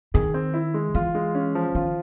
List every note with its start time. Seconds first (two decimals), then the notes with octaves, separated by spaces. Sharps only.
0.14 D#3 G#4
0.34 C4
0.54 E4
0.74 G#3
0.95 E3 F4
1.15 G#3
1.35 C#4
1.55 F3
1.75 D#3 F4